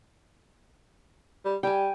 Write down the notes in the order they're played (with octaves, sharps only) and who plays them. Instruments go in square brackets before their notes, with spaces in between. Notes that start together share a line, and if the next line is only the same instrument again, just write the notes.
[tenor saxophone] G3
[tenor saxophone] G3 [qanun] G5 G#5